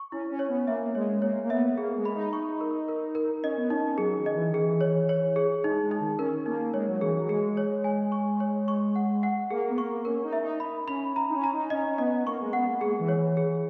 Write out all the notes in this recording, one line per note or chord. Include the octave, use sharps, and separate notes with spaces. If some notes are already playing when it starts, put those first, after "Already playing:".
Already playing: C#6
C#4 E4
C#4
C#5
B3
A#3 E5
G#3 C#5
A#3 C#5
A#3
B3 E5
A#3 G#4
G#3
B5
D#4
C#6
A#4
A#4
A#4
C#4 D#5
B3
C#4 D#4
C#4
F#3 G#4
D#3
D#5
E3
D#3
G#4
E3
C#5
C#5
G#4
G#3 D#4
G#3
D#4
D#3
C#4 A#4
A#3 D#4
G#3 C#5
F#3
E3 G#4
F#3
G#3 G#4
C#5
G#5
C#6
C#5
C#6
F#5
F#5
A#3 G#4
B3
A#3 C#6
C#4 A#4
D#4
E5
D#4
B5
C#4 B5
A#5
D#4
C#4
A#5
D#4
C#4 D#5
C#4
B3 D#5
A#3 C#6
G#3
B3 F#5
A#3
G#3 G#4
E3
C#5
E3
G#4